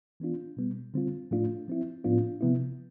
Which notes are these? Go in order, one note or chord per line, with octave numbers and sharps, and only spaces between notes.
E3 B3 D4 F4
B2 G3 B3
D3 G3 C4 F4
A2 F3 A3 D4 F4
F3 C4 E4
A2 F3 B3 D4 F4
C3 F3 B3 E4